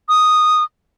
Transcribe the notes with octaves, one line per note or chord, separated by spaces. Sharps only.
D#6